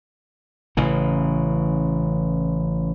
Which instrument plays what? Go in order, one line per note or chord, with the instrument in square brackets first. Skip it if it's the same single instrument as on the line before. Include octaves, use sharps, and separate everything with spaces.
[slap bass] A1 C#3 E3